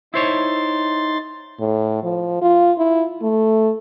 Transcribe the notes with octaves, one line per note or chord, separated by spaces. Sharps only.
D#4 E4 C5 C#5 C6 A6
A2
F3
F4
E4
A3